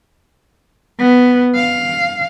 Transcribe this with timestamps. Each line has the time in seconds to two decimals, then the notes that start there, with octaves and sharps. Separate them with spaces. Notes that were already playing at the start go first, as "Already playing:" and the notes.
0.99 B3
1.55 F5